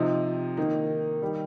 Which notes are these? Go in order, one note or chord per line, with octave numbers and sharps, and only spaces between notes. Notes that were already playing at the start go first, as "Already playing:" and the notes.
Already playing: C3 F3 C4 D#4
D#3 A#3 D#4
D#3 G3